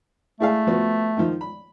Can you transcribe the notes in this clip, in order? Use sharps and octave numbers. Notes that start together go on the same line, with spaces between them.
A3 E4 G#4 F5
F3 B3 F#4
D#3 F3
B5